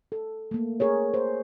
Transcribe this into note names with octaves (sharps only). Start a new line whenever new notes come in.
A4
A3 A#3
G#4 A#4 C#5
C5